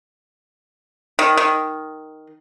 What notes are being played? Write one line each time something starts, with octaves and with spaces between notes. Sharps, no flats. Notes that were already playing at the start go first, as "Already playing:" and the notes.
D#3
D#3